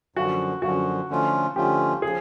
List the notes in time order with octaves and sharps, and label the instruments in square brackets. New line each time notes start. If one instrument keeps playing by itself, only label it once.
[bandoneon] F#2 D3 F3 [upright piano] F#4
[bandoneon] F#2 D3 F3 [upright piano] F#4
[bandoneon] D3 F3 A3 C#4 F4
[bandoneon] D3 F3 A3 C#4 F4 [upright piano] G4
[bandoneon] C#3 F3 [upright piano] G#4